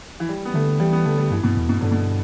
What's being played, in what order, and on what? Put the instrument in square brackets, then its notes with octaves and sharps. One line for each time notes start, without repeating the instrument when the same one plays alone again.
[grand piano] E3
G3
B3
[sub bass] D3 [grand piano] A3
[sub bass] E3 [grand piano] G3
[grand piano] B3
[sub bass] D3 [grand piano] A3
[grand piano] G3
[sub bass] G2 [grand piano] E3
[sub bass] G2 [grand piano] B2
[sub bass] E2
[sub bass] G2 [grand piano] B2
[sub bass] G2 [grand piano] D3
[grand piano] B2